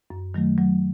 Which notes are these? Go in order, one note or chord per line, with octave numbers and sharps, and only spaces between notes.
F#2
D#3 F#3 A3
F#3